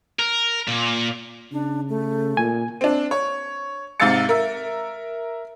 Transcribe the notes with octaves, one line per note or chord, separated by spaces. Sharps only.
A#4
A#2
C#3 D4
A3
A#2 G#5
C4 D4
C#5
G#2 C3 F5 E6 A6 C#7
A#4 E5